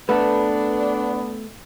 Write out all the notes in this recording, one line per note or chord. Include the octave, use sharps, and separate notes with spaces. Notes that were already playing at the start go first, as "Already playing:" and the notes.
A3 B3 D4 A4 B4